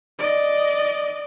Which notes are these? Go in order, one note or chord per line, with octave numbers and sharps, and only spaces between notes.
D5 D#5